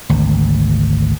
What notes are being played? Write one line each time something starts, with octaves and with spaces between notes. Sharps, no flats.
G#1 D2